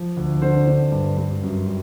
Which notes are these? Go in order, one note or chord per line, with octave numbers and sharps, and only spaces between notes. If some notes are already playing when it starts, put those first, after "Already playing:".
Already playing: F3
D2
D3 C5
D3
G2
G2
F#2
G3